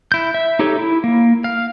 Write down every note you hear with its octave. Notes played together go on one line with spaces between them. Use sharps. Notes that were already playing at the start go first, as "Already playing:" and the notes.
E4 G6
E5
D#4 G4 A4 C#5
E4
A#3
F5